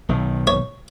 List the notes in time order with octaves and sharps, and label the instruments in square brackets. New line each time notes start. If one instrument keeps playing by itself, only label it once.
[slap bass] B1 D#3
[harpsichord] C#5